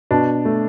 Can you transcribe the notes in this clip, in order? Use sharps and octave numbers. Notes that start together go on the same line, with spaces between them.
B2 D4
A3